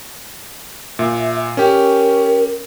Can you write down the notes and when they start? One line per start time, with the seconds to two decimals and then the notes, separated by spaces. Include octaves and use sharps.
0.99 A#2 E5
1.57 C#4 G4 A#4